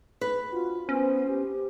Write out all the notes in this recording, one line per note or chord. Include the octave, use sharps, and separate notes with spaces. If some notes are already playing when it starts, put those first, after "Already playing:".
B4
C4 D4 F4 F#4
B3 C#4 C5
G4